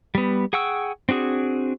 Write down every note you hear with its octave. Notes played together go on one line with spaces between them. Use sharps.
G3 B3
G#4 F#5 G5 C#6 E6
C4 D4 F#4 G#4